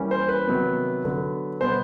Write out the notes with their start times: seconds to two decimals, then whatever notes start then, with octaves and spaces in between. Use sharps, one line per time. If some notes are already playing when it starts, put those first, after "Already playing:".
Already playing: E3 G3 A#3 C#4
0.11 C5
0.29 B4
0.47 C3 D#3 F#3 B3
1.04 D3 F#3 B3
1.61 B2 G3 B3 C5